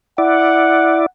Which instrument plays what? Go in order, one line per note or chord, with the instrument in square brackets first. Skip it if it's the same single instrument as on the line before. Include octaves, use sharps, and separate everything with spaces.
[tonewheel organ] E4 D5 [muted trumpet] F#5